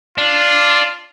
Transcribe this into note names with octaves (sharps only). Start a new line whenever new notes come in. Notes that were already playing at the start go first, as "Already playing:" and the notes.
D4 F4